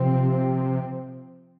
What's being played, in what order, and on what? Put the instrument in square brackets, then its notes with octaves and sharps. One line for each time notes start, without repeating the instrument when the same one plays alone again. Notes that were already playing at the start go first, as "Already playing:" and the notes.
Already playing: [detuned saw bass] C3 [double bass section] F3 C4